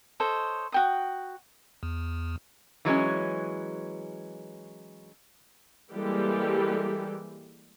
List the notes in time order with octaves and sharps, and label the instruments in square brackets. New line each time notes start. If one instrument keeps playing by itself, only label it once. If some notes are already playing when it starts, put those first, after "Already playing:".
[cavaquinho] A4 C5 C#5 D#5
F#4 G5 D#6
[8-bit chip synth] E2
[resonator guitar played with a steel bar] E3 F#3 G#3 C#4
[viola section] E3 G3 G#3 A#3 G4 A4